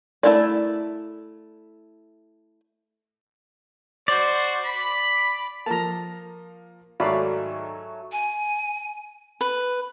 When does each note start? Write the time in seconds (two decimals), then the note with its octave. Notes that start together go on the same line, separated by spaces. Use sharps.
0.23 A3 D#4 E4 A#4 D5
4.08 F#4 C5 D5
4.65 B5
5.66 F3 A#3 A5 A#5
7.00 G#2 D#3 F#3 A3 D5 F5 G#5 B5
8.12 G#5
9.41 B4